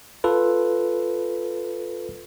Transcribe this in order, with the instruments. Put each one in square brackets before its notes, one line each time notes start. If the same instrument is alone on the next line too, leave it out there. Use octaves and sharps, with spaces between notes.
[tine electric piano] F4 A4 B4